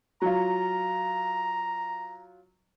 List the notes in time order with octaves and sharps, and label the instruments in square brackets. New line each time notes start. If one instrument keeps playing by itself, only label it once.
[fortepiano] F#3 F4 [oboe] A#5